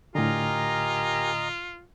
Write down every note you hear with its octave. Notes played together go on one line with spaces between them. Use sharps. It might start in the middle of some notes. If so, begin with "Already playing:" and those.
A2 D3 F4 G4 A#4 D#5 G#5 A#5